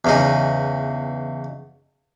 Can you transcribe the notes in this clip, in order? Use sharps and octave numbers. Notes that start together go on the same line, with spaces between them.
E2 C#3 D#4